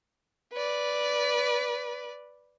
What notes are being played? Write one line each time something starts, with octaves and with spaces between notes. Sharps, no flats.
B4 D5